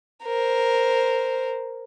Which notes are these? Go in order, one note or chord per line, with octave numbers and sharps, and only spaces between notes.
A#4 C5